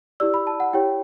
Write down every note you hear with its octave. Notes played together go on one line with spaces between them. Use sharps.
E4 G4 D5 E6
B5
A5
F#5
E4 G4 C#5 G5